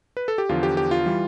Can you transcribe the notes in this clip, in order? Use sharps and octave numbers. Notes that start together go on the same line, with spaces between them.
B4
A4
G4
E2 D3 F3 F4
G4
G4
F4
E3 G3